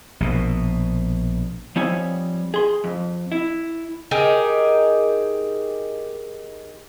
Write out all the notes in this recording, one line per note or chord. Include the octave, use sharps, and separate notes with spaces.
A#1 B2
F3 G3 C4 D#4 C#5 G#5
G#4 C6
F2
E4
D#4 G4 G#4 A#4